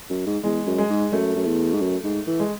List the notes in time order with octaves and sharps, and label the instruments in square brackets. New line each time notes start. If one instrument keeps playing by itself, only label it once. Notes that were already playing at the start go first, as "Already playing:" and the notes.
[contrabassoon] F#2
G#2
[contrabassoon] E2 [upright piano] G#3
[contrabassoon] F#2
[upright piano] G#3
[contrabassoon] G#2
[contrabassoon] F#2 [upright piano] A3
[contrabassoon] F#2
E2
G#2
F#2
G#2
E3
[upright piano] G#3